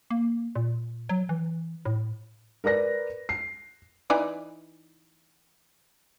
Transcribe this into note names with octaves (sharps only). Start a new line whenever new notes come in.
A#3
A#2
F#3
E3
A2
A#4 B4 D5 A#6
C7
E3 D#4 D5